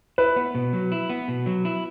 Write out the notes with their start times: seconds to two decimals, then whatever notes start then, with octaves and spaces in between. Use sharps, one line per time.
0.18 E4 B4
0.36 B3
0.55 B2
0.73 F#3
0.92 E4
1.10 B3
1.28 B2
1.46 F#3
1.65 E4